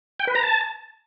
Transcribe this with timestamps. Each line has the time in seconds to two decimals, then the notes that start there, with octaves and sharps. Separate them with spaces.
0.20 G5
0.27 B4
0.35 A#5
0.43 A5